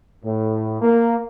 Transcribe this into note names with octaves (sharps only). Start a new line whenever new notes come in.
A2
A#3